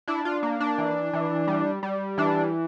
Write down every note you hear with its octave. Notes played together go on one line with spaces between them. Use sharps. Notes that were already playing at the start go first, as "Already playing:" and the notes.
D4 E4
F4
A#3
D4
E3
E3
G3
G3
E3 D4